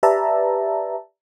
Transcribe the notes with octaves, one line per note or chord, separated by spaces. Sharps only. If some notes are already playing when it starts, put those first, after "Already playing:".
G4 B4 D5 E5 A5 A#5